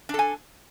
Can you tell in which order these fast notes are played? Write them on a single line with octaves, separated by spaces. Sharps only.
D4 A4 G#5